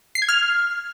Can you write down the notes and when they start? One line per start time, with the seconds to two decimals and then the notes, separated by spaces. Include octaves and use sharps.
0.15 C7
0.22 G#6
0.29 F6